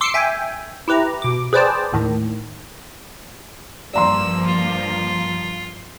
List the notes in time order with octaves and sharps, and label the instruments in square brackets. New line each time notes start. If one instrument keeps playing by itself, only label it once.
[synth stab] C6 D6 E6 C7 C#7
E5 G5 G#5
E4 G4 B4 A#5
B2 D6
G#4 B4 C5 D5 G5 A5
D#2 A2 D#3
[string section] G2 F3 A#3 [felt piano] D5 A#5 C6 [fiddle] E6
[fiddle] F4